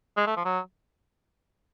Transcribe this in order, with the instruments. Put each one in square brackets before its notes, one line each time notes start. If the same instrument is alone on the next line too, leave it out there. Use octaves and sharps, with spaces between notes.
[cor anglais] G#3
A3
F3
F#3